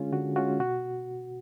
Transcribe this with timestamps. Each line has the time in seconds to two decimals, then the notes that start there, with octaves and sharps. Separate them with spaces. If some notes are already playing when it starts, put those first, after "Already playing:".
Already playing: D3 G#3 C#4 F4 G#4
0.13 D3 F#4
0.36 G#3 C#4 F4 F#4
0.59 B2 F#4